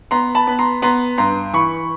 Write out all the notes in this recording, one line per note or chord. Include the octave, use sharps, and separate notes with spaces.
B3 A#5 C6
A5 B5
B3
A#5 C6
B3 A#5 C6
G2 A#5 C6
E3 B5 C#6